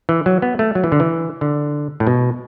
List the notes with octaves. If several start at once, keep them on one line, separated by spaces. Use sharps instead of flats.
E3
F#3
B3
A3
F#3
E3
D3
E3
D3
A2
B2